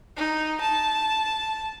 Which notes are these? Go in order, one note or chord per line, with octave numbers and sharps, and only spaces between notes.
D#4
A5